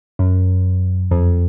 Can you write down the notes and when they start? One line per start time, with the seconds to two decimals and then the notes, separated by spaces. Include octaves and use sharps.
0.19 F#2
1.11 F2